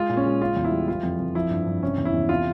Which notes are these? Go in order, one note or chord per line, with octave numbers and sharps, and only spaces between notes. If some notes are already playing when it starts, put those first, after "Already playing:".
Already playing: G#3 F4
A#2
C#4
G#3
C#3 F4
E2
E4
G3
E3 F4
F2
F2
F3 E4
G2
G2
C3 C#4
E2
E4
E2
C3 F4